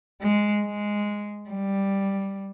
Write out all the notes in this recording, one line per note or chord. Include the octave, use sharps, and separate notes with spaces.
G#3
G#3
G3